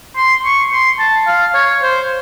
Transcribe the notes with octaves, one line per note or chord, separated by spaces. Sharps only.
C6
C#6
C6
A5
F5
C#5
C5